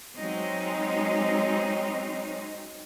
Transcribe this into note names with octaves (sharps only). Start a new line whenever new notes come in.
F#3 G#3 C4 C#4 D#4